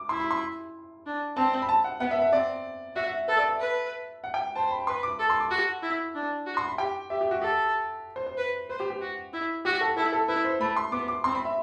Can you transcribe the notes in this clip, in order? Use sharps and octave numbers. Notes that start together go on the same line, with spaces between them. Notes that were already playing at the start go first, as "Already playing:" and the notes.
Already playing: D6
E4 C6
B5
C6
D4
C4 A5
B5
A5
F#5
B3 F#5
E5
E5
C4 D5
F#4 E5
E5
A4 B4
D5
E5
B4
F#5
G5
C5 A5
B5
B4 C6
D6
A4
C6
D6
F#4
E4
D4
F#4
C6
B5
G4 G5
G4 E5
G4
F#4
G4 A4
C5
C5
B4
B4 C5
G4
G4
F#4
E4
F#4 G4
A4
E4 A4
A4
E4 B4
C5
A3 B5
C6
B3 D6
D6
C4 C6
B5
E5